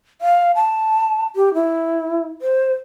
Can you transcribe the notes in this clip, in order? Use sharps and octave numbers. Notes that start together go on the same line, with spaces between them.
F5
A5
G4
E4
C5